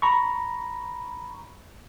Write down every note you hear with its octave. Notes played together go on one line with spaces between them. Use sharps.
A#5 B5 C#6